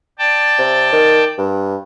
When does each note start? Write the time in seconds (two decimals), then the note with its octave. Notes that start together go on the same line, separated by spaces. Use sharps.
0.19 D5 G5 A5
0.59 C3
0.93 D#3
1.38 G2